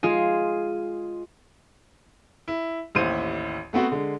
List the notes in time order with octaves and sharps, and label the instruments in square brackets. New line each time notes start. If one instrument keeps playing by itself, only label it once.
[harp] G#3 F4 G#4
[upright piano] E4
A1 D#2 E4 C5 D#7
A3 B3 C4 F#4
D3 G#3